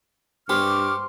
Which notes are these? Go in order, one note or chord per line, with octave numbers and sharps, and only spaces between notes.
G2 G4 C5 C#6 D6 F6